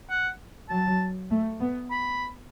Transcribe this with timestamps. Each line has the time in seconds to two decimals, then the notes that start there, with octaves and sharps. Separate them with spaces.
0.10 F#5
0.69 F#3 A5
1.30 A3
1.60 B3
1.91 B5